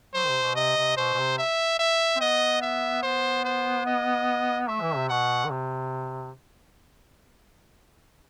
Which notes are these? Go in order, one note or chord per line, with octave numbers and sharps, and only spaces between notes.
F#3 C5
D#3
C3
B2
C3 D#5
C3
B2 C5
B2
C3
E5
E5
C4
B3 D#5
E5
B3 C5
C5
D#5
A3 E5
E3
C3
B2 F#5
D#3
C3